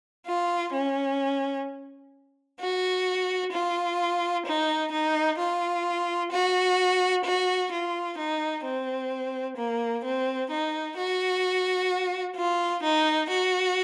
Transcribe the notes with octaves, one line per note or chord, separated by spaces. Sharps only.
F4
C#4
F#4
F4
D#4
D#4
F4
F#4
F#4
F4
D#4
C4
A#3
C4
D#4
F#4
F4
D#4
F#4